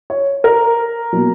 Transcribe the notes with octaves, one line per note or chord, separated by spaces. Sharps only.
C#5
A#4
B2 F#3 A#3